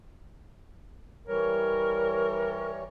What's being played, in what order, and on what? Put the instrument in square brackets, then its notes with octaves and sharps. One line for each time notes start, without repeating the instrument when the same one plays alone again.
[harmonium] E3 G3 C#5 [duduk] A#4